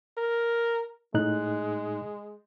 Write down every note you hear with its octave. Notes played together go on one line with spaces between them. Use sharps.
A#4
A2 G#3 D#4 F#6